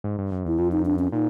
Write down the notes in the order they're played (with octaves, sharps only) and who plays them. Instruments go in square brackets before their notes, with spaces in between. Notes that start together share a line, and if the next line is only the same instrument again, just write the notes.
[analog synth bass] G#2
G2
F#2
[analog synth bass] E2 [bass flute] E4
[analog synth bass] F2 [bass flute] F4
[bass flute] D#4
D4
C#4
[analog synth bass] A#2 [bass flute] D#4